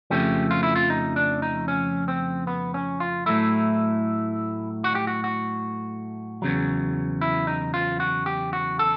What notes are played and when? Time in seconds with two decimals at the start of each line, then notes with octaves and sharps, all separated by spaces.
0.10 F2 C#3 F3 A3 G4
0.51 F4
0.63 E4
0.76 F4
0.90 D#4
1.16 D4
1.42 D#4
1.68 C#4
2.08 C4
2.47 B3
2.74 C#4
3.00 F4
3.26 A2 F#3 A3 E4
4.84 F#4
4.95 G4
5.07 F#4
5.24 F#4
6.42 E2 C#3 F#3
7.21 E4
7.47 D#4
7.74 F4
8.00 F#4
8.26 G4
8.53 F#4
8.79 A4